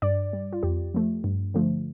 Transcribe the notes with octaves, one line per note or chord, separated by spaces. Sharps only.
G2 D5
G3
F4
F2 G4
F3 A3
G2
D3 F3 A3